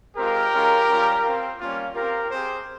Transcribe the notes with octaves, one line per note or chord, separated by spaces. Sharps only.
G#3 C4 F4 G4 A#4
G#3 C#4 F4
G3 C#4 F4
C4 F4
G3 A#3 C#4 F4
C4 F4 G4 A#4
C4 G4 G#4 C5